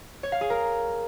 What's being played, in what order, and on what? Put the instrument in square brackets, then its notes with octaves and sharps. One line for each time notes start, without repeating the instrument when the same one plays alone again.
[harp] C#5
F5
G#4
A#4